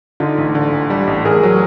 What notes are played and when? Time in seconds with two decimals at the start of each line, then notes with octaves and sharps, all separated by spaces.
0.20 D3 D#4 F4
0.38 A1
0.55 D3
0.72 A1
0.90 G3
1.07 A1
1.25 A1 G#4 A#4
1.43 F#3